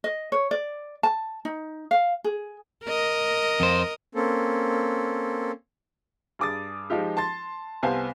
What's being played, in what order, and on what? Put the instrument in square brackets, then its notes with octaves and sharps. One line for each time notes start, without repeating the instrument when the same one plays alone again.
[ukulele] D#5
C#5
D5
A5
D#4
F5
G#4
[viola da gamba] A#4 D#5
[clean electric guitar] F2 C5
[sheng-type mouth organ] A#3 C4 C#4 A4
[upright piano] G2 G#4 D6 D#6 A6
F3 G#3 D#4 F4 G4
A5 C6 A6
C2 B3 C5 F5 G#5 A5